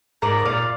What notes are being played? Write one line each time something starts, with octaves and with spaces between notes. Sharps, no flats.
G#2 A#4 D5
A#2 D5 F5